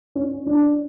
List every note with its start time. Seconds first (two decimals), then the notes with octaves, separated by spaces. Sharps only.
0.15 C#4
0.46 D4